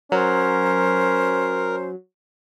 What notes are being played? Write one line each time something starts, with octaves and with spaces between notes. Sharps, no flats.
F#3 C#4 A#4 C5